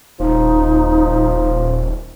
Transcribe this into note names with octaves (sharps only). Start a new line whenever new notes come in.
D#1 F3 D#4